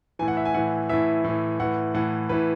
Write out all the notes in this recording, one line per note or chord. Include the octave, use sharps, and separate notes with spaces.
A2 E3 G#5
F#5
E5
G#5
A2 E3 F#5
A2 E3 E5
A2 E3
A2 E3 F#5
A2 E3 F#5
A2 E3 B4